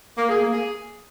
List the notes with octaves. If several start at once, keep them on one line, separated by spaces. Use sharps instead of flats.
A#3
G#4
A#3
G#4